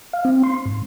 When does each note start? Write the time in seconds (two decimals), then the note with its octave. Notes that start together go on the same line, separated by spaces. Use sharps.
0.13 F5
0.25 C4
0.44 C6
0.65 G#2